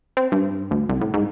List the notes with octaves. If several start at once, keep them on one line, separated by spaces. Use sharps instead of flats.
C4
G2
D2
C2
A2
G#2